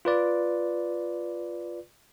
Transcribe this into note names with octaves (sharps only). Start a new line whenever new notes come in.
F4 B4 D5